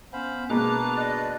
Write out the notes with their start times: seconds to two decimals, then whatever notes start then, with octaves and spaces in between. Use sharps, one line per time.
0.13 B3 C#4 C5 F5 B5
0.50 B2 G#3 A#3 D4 B4 A#5 D6 F#6
0.97 D5 D#5